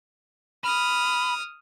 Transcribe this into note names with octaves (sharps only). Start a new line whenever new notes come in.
B5 D#6 F6